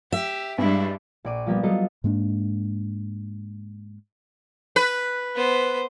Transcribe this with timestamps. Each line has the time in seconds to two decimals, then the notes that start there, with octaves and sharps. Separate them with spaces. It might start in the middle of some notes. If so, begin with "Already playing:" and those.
0.12 G4 E5
0.58 G2 G3 G#3 D4 E4
1.25 A#1 D5 D#7
1.46 F3 G3 A#3 B3
1.63 F#3 G3 A4 D#5 F5
2.04 G#2 G#3 A#3 D4
4.76 B4
5.35 B3 C5